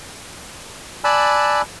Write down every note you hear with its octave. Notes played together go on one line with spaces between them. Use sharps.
D5 G#5 A5 B5 E6 F#6